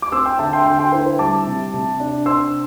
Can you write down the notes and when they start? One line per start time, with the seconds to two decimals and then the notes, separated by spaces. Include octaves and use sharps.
0.02 D6
0.12 C4 C6 E6
0.26 G5 C6
0.39 D3 E5 A5
0.53 G5 C6
0.66 D3 G5 C6
0.79 G5 C6
0.92 E4 C5
1.06 C5
1.19 G3 A5 D6
1.47 C3
1.74 C3
2.00 D4
2.26 C4 C6 E6